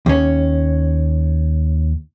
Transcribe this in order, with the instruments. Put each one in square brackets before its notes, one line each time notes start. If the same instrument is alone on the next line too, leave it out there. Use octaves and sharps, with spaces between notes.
[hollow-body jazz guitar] D#2 C#4